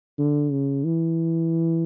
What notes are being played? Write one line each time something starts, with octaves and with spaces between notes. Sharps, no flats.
D3
C#3
E3